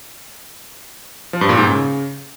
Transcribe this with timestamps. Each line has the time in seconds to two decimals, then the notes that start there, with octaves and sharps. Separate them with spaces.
1.33 F3
1.41 G2
1.49 A#2
1.57 G#2
1.65 C#3